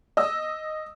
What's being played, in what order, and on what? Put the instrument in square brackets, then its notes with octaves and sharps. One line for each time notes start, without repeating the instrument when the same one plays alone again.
[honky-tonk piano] D#5 D#6 E6